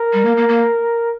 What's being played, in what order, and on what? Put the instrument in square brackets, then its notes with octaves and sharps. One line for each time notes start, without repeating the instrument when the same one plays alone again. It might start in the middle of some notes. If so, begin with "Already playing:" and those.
Already playing: [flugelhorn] A#4
[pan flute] G3
A#3
A#3
A#3